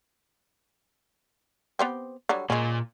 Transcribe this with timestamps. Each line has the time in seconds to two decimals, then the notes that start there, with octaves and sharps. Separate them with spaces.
1.79 B3 C4 G4
2.29 D3 F#3 G3
2.50 A#2 G#3 C#4